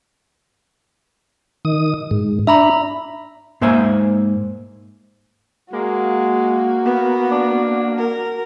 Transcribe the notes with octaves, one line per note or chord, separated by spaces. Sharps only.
D#3 D#6
G#2
D4 E5 A#5 B5
G#2 A#3 C5 E5 G#5
G#3 A#3 F#4
B3
D4
A#4